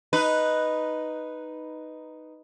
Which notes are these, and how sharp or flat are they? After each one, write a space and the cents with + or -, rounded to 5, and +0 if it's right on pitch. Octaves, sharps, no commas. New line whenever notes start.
D#4 +0 B4 +0